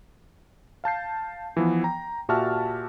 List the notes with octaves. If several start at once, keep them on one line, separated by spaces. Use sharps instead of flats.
F5 A5 G6 C7
E3 F3 B3
G5 A#5
A#2 F#4 G4 E5 A5 F6